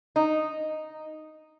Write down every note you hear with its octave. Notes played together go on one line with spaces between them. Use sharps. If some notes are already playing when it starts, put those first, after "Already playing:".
D#4